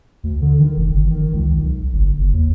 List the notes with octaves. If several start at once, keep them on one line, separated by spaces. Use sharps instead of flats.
D2
D3
D#3
F1
G1
D#3
C#2
B1
G1
F#1
D#2